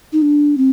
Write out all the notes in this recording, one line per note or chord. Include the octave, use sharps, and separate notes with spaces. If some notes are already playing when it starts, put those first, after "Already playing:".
D#4
D4
C4